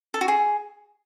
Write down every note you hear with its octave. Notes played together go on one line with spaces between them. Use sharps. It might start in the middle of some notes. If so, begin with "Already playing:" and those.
A4
F#4
G#4